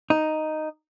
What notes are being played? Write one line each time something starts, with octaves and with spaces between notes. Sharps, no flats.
D#4